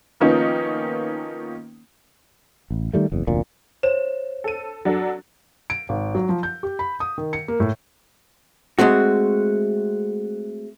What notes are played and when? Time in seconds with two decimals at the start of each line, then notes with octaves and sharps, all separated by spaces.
0.20 D#3 F3 A#3 B3 C#4 D#4
2.71 A1
2.93 D#3 G3 A3
3.12 F#1 E2
3.27 F1 D2 A#2
3.83 C5 C#5 E7
4.44 A4 D#7
4.85 F#3 D4 A4
5.70 D7
5.89 G#1
6.15 F#3
6.29 F3
6.43 G6
6.63 G4
6.79 B5
7.00 D#6
7.18 D#3
7.33 C#7
7.48 A#3
7.60 A2
8.79 G#3 A3 C4 F#4